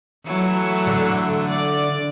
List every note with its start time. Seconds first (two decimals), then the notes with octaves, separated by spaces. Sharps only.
0.25 E3 F#3 A3
0.87 D3
1.49 D5